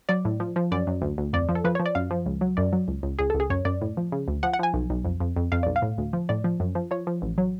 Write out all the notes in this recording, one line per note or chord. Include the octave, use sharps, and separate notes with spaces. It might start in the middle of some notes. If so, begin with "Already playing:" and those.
F#3 D5
A2
F3
F3
F#2 D5
F#2
D2
D2
F2 D5
F3
A4
F3 B4
F3 C#5
D5
F#2 F5
F3
C#2
F#3
F#2 D5
F#3
C#2
C#2
C#2 G#4
A4
C#2
G#4
F#2 C#5
F#2 D5
A2
F3
C#3
D2
F3 F#5
F#5
F3 G#5
B1
B1
F2
F2
F2
F2 F5
B1 D5
F5
A2
D2
F3
A2 D5
F3
F#2
F3
F3 C#5
F3
A1
F#3